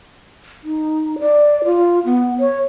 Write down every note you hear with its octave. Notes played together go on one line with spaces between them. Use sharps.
D#4
D5
F4
B3
C#5